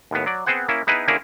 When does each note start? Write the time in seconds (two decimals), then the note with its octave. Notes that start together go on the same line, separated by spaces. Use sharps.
0.11 D#2 A2 B3
0.26 F#3 D5
0.46 B3 C4 G#4 C5 F#5
0.68 A#3 C#4 E4
0.87 B3 D#4 E4 G#4 B4
1.08 D3 A#3 C#4 E4 G#4 A#4